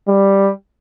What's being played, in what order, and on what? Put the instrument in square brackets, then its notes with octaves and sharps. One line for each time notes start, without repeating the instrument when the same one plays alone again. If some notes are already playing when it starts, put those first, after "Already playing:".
[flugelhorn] G3